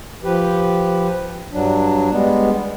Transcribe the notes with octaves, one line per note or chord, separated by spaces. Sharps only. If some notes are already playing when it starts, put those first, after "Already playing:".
F3 G4 B4
G2 F#3 D4
G3 G#3 B3